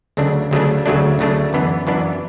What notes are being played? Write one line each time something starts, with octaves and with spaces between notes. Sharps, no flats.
D2 C#3 F#3 A3 D4
D2 C#3 F#3 A3 D4
D2 C#3 F#3 A3 D4
D2 C#3 F#3 A3 D4
F#2 E3 B3 D4
F#2 E3 B3 D4